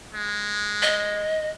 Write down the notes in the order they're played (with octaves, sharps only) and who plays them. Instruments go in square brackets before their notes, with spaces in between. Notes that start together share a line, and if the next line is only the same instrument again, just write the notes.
[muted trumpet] G#3
[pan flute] D#5